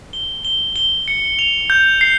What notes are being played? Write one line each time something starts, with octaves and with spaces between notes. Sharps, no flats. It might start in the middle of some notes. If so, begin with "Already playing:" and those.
G7
G7
G7
C#7
F7
G6
C7